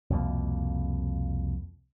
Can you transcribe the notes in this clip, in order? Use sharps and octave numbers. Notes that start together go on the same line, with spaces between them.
C2 F2 B2 A#3